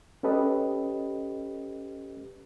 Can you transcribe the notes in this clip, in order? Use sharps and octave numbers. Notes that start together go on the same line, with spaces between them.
C#4 G4 A4 B4 D#5